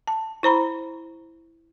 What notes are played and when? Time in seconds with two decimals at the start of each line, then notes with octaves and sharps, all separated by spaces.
0.08 A5
0.43 E4 C5 A#5 B5